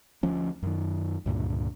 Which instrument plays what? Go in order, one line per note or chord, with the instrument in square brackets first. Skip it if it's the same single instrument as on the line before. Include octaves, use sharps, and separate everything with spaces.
[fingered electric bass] D2 F3 C#4
F#2 D#3
C#2 G2 A#2 D3